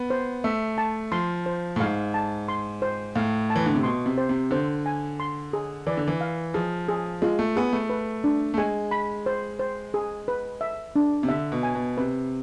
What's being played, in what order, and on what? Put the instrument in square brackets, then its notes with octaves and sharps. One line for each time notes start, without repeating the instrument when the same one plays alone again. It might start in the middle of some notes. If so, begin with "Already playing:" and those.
Already playing: [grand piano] B3
[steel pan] C5
[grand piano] A3 [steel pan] E5
[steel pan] A5
[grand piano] F3 [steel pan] C6
[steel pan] C5
[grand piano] A2
[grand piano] G#2 [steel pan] F5
[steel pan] A5
C6
C5
[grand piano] A2 [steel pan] F5
[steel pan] A5
[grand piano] E3
D3
C3
[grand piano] B2 [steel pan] C6
[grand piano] C3
[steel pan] C5
[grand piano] C3
[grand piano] D3 [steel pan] C5
[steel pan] G#5
C6
G#4
[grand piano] E3 [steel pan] D5
[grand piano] D3
E3
[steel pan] F5
[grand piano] F3 [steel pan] G#4
[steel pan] G#4
[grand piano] G#3 [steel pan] F4
[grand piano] A3
[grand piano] B3 [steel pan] G#4
[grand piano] A3
[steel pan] B4
D4
[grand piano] A3
[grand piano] G#3 [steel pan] G#5
[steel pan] B5
C5
C5
G#4
B4
E5
D4
[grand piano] C3
[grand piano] D3 [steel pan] E5
[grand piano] B2
[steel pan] G#5
[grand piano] B2
[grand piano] C3 [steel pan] B4